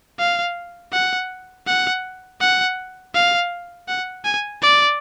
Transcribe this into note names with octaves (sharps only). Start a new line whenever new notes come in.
F5
F#5
F#5
F#5
F5
F#5
G#5
D5